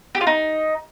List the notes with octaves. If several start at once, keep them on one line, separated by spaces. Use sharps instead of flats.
G4
F4
D#4